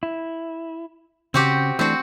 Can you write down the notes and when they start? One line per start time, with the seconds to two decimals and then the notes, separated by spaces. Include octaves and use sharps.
0.03 E4
1.34 C#3 C4 F#4 G4
1.79 E3 A3 C4 D4 F#4